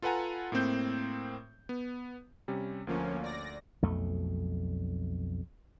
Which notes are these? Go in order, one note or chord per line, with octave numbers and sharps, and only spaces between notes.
F4 A4 B4 F#5 G#5 A#5
A2 A#3 C4 G6
B3
C3 G3 C#4
D2 F3 A#3 C#4
D5 A#6
B1 F2 A3